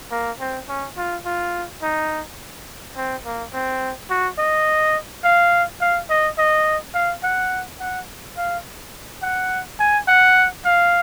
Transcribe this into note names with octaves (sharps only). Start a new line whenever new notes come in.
A#3
C4
C#4
F4
F4
D#4
C4
A#3
C4
F#4
D#5
F5
F5
D#5
D#5
F5
F#5
F#5
F5
F#5
G#5
F#5
F5